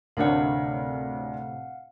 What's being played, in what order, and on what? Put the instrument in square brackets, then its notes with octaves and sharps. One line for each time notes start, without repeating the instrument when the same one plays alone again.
[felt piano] D2 D4 A#4 [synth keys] A2 C3 A3 [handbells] F5 F#5